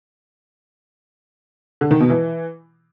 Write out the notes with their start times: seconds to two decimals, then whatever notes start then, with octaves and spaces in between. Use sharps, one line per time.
1.81 D3
1.91 D#3
2.00 B2
2.10 E3